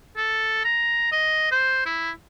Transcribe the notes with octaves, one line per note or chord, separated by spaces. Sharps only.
A4
A#5
D#5
C5
E4